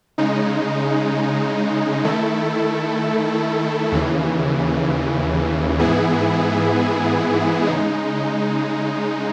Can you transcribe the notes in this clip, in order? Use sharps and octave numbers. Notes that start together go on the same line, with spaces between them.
C#3 G#3 D#4
D#3 A3 E4 A4
D#2 C#3 E3
G#2 E3 B3 E4 G#4
C#3 G#3 D#4